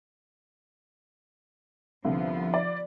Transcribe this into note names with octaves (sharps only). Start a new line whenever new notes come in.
C2 D3 F3 B3 F5
D5